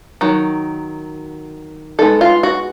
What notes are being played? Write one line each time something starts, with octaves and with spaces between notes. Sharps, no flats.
D#3 F#3
G#3 B3 D#4 A4
F4
F#4